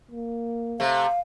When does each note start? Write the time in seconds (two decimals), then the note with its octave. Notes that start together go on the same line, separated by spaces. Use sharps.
0.11 A#3
0.80 C3 A3 F5